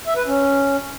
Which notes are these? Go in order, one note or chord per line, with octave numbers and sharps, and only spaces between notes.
E5
B4
C#4